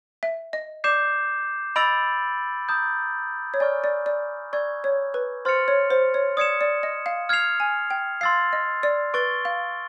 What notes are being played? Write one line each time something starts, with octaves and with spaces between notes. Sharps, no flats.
E5
D#5
D5 D6 G6 C7 E7
D#5 B5 E6 A6 D7 F#7
A#5 D#6 G6
C#5
D5 G#5 C#6 F6
D5
D5
D5 C#6 E6 G#6
C#5
B4
C5 C6 F6 A6 C#7 F7
C#5
C5
C#5
D5 D#6 G#6 C#7 E7
D5
D#5
F5
F6 G#6 C7 F7
G#5
G5
F5 C6 E6 A6 C7
D#5
D5
B4 C#6 E6 A6 D7 G7
F5